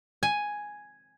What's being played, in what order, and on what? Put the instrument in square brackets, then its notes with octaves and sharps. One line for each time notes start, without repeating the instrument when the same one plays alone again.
[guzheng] G#5